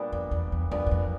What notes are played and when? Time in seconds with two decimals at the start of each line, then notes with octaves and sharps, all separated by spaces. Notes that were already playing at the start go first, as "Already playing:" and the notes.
Already playing: A#2 G3 B3 D4
0.12 F2
0.31 E2
0.52 E2
0.71 F2 A#2 G3 B3 D4
0.87 F#2
0.91 F2